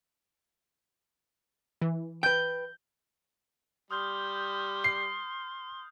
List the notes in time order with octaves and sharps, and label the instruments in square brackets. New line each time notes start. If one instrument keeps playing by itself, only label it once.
[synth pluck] E3
[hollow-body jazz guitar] B4 G5 [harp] G6
[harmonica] G3 [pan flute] C6 [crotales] D#6 F6 G6
[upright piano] C7